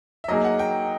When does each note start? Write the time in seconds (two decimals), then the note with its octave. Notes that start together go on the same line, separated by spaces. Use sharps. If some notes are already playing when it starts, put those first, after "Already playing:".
0.24 E5
0.28 F#3 A#3 D#4 G#4 D#5
0.45 F#5
0.59 G5